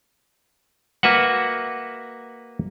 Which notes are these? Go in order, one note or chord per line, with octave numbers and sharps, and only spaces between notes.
A#3 F#4 B4 E5 F#5